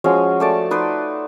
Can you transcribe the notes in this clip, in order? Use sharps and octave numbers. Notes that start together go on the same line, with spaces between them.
F3 G#3 C#4 F#4
A3 D5 A5
D#4 B4 D5 C6